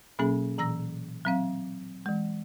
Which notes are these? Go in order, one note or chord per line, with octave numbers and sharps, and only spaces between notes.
B2 F#3 A#3 C#4 G#4
A#2 E3 A#5 E6 A#6
F#3 C4 F5
E3 G#3